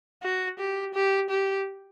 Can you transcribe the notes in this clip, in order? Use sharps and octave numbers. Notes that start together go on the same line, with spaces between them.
F#4
G4
G4
G4